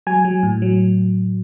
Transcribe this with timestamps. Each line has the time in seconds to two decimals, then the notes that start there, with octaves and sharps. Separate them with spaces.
0.07 F#3 G#5
0.25 F#3
0.43 A2
0.62 F#3